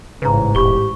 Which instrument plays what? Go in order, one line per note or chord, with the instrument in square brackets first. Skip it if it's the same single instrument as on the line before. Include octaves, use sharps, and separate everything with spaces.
[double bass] A1 G#2 [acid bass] C#3 [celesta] B4 A#5
[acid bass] E1 [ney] G4 [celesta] B5 C#6 G7